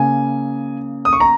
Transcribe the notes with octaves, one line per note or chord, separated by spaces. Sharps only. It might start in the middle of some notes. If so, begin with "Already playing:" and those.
Already playing: C#3 A#3 G#5
D#6
C#6
A#5